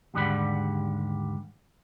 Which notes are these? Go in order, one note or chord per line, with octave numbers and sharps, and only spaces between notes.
D#2 G#2 D3 G3 F#5 B5